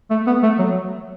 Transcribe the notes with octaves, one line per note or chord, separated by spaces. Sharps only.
A3
B3
A3
F#3